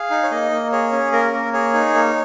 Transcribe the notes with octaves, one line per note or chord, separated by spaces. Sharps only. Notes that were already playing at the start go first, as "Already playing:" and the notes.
Already playing: G#4 F5
D#4
C#5
A#3 D#5
A#3
G#4 C#5
C#4
A#3 A#4
A#3
G#4 C#5
D#4
A#3